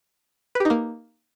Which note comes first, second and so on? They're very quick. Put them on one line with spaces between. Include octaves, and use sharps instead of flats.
B4 G4 D#4 A#3